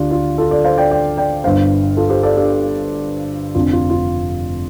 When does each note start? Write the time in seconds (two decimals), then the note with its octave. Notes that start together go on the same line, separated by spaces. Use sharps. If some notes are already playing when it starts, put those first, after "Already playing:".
Already playing: D2 D4 F4 G4
0.11 F4
0.38 F4 A4
0.51 A4 D5
0.65 C5 F5
0.78 D5 G5
0.91 D5 G5
1.17 D5 G5
1.44 G1 G2 D3 C5 F5
1.97 F4 A4
2.10 G4 C5
2.23 A4 D5
2.36 D4 G4
3.55 F1 F2 D3 F4
3.73 F4
3.90 F4